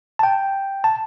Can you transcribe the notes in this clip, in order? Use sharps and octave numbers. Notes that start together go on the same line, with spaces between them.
A5
G5
A5